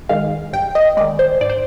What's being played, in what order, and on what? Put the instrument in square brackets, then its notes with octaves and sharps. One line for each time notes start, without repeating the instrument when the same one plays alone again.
[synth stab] D#3 G#3 F5
G2 G5
D#5
D#3 G#3 D5
C5
G#2 D5
C5